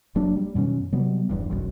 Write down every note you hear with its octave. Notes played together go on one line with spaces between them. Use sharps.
F1 F#3 A#3 D4
G3
F#2 B2 D#3 C#4
C3 F#3 G3 B3
D#1 E2 G2
E1 B1 F#2